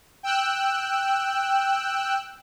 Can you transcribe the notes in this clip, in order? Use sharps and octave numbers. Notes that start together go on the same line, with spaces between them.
G5 E6 F#6